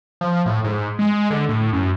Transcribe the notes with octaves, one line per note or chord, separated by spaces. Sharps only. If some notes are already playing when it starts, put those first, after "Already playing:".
F3
A2
G#2
G#3
D3
A2
F#2